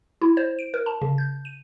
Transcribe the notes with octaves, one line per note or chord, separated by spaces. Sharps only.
E4
C5
D7
A#4
A5
C#3
G6
D#7